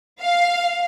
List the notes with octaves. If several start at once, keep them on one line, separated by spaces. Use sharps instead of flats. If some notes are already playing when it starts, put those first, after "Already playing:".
F5